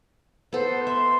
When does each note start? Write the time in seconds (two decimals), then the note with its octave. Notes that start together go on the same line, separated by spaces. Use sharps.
0.53 B3 A4 C5
0.87 E5 C6